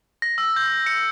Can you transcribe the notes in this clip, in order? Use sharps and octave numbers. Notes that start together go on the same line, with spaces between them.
A#6
E6
G6
C#7